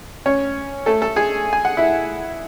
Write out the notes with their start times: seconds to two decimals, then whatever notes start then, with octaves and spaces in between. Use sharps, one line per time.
0.26 C#4 C#5
0.86 A3 A4
1.02 A3 A4
1.16 G#4 G#5
1.53 G#5
1.65 F#5
1.77 E4 E5